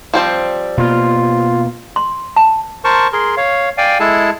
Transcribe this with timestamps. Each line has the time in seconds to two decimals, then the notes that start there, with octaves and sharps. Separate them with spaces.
0.14 F3 G3 C4
0.77 B2 A#3 F4
1.96 C6
2.36 A5
2.84 A#4 C5 A5 C#6
3.13 G#4 A#4 C6
3.37 C#5 F5
3.78 D5 F5 G5 G#5
4.00 G#3 E4 G#4 A4 A5